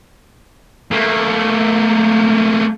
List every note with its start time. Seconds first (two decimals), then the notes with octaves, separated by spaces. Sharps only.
0.91 A3 A#3